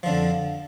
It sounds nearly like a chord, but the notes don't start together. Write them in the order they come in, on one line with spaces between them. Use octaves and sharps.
F3 D3 F2